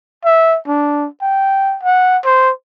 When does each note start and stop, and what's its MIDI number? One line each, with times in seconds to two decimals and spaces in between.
0.25 0.58 76
0.67 1.07 62
1.21 1.78 79
1.83 2.18 78
2.25 2.51 72